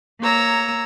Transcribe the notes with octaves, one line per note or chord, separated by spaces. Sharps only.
A#3 C#5 A#5 E6